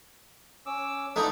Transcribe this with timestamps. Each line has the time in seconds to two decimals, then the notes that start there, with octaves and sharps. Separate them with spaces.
0.66 C#4 D6 E6
1.16 A3 B3 D#4 D5 F#6